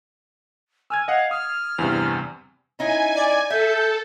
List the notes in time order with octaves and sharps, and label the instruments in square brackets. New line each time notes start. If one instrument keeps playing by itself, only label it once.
[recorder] G#5 [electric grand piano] E6 F6 G#6
[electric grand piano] D#5 F#5 [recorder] F5
[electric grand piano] D#6 [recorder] F6
[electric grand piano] E2 G2 C3
[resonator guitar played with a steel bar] C#4 D#4 E4 [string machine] G#5
[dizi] D5
[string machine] A4 [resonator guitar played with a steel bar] E5 [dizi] G6